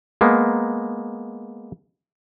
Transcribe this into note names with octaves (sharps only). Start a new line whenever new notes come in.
G#3 A#3 B3